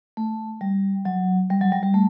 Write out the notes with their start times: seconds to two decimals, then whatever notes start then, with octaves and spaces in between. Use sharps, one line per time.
0.17 A3
0.61 G3
1.05 F#3
1.50 G3
1.61 F#3
1.72 G3
1.83 G3
1.94 A3